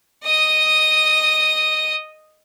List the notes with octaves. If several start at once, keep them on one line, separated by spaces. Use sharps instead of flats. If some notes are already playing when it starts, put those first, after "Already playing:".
D#5 D#6